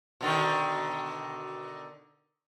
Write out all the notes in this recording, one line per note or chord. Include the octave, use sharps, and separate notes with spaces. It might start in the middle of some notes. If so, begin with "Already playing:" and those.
B2 D3 D#3